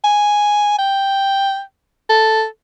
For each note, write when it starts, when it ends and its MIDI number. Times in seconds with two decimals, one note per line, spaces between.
0.04 0.76 80
0.79 1.61 79
2.09 2.45 69